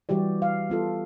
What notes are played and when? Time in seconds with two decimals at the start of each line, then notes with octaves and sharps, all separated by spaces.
0.09 E3 G3 F#4 G4 D5
0.42 F5
0.70 B3 F4 A4